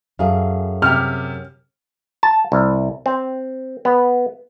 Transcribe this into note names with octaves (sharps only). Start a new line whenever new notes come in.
F#2 G#4 A4 E5 F5
C3 G4 F6
A5
C2
C4
B3